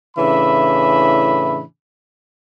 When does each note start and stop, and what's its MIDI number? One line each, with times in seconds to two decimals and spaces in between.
0.17 1.61 45
0.17 1.61 49
0.17 1.61 52
0.17 1.61 62
0.17 1.61 76
0.17 1.61 83